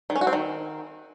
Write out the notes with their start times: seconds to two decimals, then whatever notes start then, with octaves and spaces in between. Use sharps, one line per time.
0.10 D#3
0.16 C#4
0.21 F#4
0.27 C4
0.33 D#3